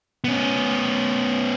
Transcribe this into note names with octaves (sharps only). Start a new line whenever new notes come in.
B3 C#4